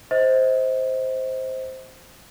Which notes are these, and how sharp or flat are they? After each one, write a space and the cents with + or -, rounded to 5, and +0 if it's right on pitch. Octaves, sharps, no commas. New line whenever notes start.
C5 +0 D#5 +40